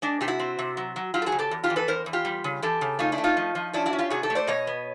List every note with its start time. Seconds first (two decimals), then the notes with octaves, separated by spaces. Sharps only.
0.02 G#3 D4
0.21 C3 G4
0.28 E4 F#4
0.39 C4
0.59 C3
0.77 F#3
0.96 F#3
1.14 F#3 F4 G4
1.22 A4
1.26 F#4 G#4
1.32 C#3
1.39 G4 A4
1.51 E2
1.64 F4 G4
1.70 E2
1.76 A4 B4
1.88 E2 A#4 C5
2.06 E2
2.13 F4 G4
2.25 G3
2.44 C#3
2.62 E3 G4 A4
2.81 C#3
2.99 A3 D#4 F4
3.12 D4 E4
3.18 A3
3.24 D#4 F4
3.37 F3
3.55 F3
3.73 C#4 D4 E4
3.86 E4 F#4
3.93 C#4
3.98 F4 G4
4.10 C3 F#4 G#4
4.23 G4 A4
4.30 A3
4.35 C5 D5
4.47 B2 C#5 D#5
4.67 B3